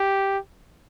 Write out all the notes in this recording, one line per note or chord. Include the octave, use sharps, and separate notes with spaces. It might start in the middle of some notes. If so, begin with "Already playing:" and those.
Already playing: G4